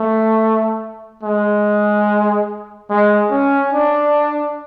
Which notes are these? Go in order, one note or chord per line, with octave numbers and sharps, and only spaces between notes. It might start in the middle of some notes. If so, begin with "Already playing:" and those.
Already playing: A3
G#3
G#3
C#4
D4